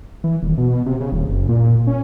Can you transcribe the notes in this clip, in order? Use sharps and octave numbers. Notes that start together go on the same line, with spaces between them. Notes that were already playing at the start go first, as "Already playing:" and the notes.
E3
D#1
B2
C3
C#3
D#1
F#1
A#2
C#4